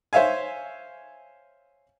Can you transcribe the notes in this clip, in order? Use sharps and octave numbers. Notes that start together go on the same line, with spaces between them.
C5 C#5 E5 F5 G#5